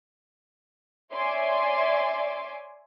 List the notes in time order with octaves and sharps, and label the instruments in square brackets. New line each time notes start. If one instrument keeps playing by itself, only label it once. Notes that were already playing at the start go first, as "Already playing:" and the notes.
[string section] C#5 D5 E5 G#5 C6 D6